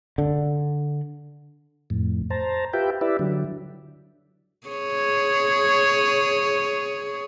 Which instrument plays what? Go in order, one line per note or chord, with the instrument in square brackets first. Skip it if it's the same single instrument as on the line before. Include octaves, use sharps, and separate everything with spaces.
[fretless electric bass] D3
[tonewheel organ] F2 A2
C5 A5 A#5
F4 G4 B4 E5 G5
E4 G4 B4 D5 E5
D3 F#3
[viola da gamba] G#4 C#5